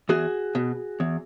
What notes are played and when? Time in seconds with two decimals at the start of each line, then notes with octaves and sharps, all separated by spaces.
0.09 E2 F#4 G#4
0.55 B2
1.00 E2